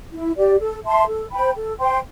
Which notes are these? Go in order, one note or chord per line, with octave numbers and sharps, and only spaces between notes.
E4
G4 D5
A4
E5 A5 C6
A4
C5 G5 B5
A4
C5 G5 C6